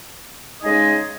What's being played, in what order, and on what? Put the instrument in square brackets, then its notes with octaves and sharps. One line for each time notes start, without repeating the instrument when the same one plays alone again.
[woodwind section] C#3 G#3 D#4 G#4 D#5